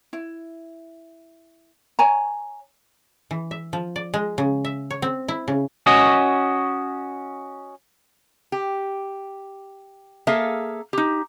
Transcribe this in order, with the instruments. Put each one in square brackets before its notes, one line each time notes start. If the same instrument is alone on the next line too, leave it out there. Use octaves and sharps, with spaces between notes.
[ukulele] E4
C#5 G#5 A#5
[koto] E3
E5
F3
D5
G#3
C#3
E5
C#5
C4
E4
C#3
[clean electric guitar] C#4 F#4 D#5
[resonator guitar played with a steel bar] G4
A#3 G#4 A4 E5 F5
D#4 G4